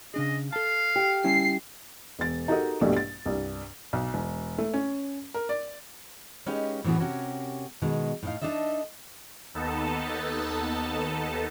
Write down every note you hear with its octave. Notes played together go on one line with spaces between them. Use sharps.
C#3 D4 G#4 D#5
A4 F5 A5
G4
G3 C#4 E4 C7
E1 A6
D#4 F#4 G4 A4 A#4 D#5
A#1 G2 B2 G3 A3
A6
C2 G2
B1
E1
A3
C#4
A#4
D5
G#3 C#4 D#4 G4 B4 F5
A2 E3 F#3 B3 C#4 G#4
C3 C#4 F#4 G4 A#4 G#5
B2 D#3 G#3
A2 D#4 F5
D4 D#4 A4 D#5 E5
D#2 B3 D#4 A4 A5